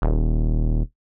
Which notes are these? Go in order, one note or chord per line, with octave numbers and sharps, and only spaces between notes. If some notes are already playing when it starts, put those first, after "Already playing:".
D#1